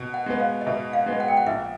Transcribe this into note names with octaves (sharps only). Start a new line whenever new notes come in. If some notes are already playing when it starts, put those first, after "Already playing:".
Already playing: B2
F#5
G#3 B3
F5
D#5
B2 E5
F5
G#3 B3
F#5
G5
F#5
A#1 E5